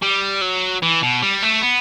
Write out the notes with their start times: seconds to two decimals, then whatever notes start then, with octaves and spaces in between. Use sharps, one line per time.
0.02 G3
0.41 F#3
0.82 E3
1.02 B2
1.22 G3
1.43 A3
1.62 B3